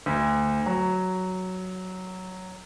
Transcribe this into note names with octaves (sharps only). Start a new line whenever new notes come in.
D2
F#3